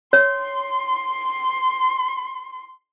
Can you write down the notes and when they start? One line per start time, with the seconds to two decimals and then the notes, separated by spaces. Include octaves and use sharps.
0.13 C#5 C6